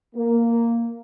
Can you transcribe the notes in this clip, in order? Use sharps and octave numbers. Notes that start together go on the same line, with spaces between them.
A#3